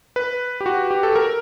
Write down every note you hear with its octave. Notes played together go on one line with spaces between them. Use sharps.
B4
G4
F#4
G4
A4
A#4